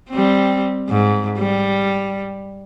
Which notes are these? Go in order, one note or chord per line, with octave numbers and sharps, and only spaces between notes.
G3 C4
G#2
G3